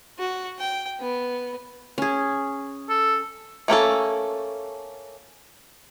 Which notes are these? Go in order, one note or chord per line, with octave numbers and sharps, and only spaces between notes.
F#4
G5
B3
C#4 G#4
A4
A3 A#3 C#4 A4